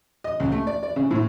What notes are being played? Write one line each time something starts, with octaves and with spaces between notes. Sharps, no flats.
D#5
C#2
A3
D5
D5
C#3
A2